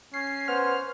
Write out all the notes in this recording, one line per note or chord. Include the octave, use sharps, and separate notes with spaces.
C#4 C7
B3 C5 F6